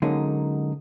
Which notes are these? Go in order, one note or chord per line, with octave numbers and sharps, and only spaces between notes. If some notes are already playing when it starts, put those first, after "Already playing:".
D3 F#3 G#3 A#3 C#4 D#4